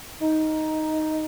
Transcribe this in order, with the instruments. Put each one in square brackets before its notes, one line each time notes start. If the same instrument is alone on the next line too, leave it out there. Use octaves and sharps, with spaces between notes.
[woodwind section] D#4